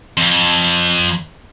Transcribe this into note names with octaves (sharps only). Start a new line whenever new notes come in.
F2